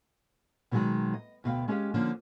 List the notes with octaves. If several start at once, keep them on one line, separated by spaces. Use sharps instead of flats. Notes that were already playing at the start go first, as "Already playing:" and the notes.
B2 D3 D#3 F#3 G#3
D#5
D2 B2 F5 G5
G#3 C#4 G4 G#4 F5
D3 F3 A#3 C#4